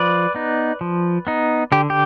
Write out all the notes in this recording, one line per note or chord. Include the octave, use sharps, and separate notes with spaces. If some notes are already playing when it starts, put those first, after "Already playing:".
Already playing: F3 B4 D5
B3 D#4
F3
B3 D#4
D3 G4
G4